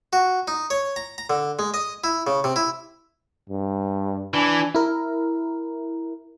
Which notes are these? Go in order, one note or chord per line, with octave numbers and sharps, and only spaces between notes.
F#4
D#4
C#5
A#5
A#5
D3
G#3
D#5
E4
C#3
C3
E4
G2
E3 D4 G#5
E4 A#4